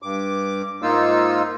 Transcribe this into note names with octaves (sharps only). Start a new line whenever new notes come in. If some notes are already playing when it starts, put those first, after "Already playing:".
G2 D6
G#2 A#3 D#4 F4 E6